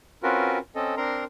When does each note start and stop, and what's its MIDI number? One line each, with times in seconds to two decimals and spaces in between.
0.23 0.58 60
0.23 0.58 61
0.23 0.58 65
0.23 0.58 66
0.23 0.58 70
0.23 0.58 71
0.75 0.95 60
0.75 0.95 61
0.75 0.95 69
0.75 0.95 75
0.97 1.24 60
0.97 1.24 62
0.97 1.24 70
0.97 1.24 82
0.97 1.24 84